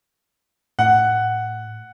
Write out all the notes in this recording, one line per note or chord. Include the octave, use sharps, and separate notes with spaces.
A2 F#5